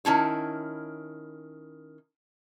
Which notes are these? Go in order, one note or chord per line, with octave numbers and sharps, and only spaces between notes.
D#3 C#4 E4 A5